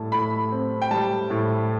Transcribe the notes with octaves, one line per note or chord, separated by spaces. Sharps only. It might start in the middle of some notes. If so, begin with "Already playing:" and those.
Already playing: A2 G3 A5
A2 B5
C4
G5
G3 A5
A2